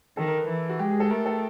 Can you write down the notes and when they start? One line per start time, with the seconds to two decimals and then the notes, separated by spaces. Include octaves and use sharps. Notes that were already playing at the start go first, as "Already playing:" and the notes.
0.17 D#3 A4
0.28 A#4
0.38 B4
0.49 E3
0.69 F#4
0.79 G#3 G4
0.90 G#4
1.00 A4
1.10 A3 A#4
1.26 A4